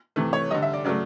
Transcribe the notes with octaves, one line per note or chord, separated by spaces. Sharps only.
C3 E3 A3
C#5
D3 G3 D#5
E5
D5
C#3 F#3 A3 D5